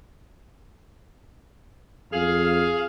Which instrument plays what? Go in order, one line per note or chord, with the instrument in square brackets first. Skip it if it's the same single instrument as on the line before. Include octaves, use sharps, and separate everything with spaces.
[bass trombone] F2 [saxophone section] G#4 F5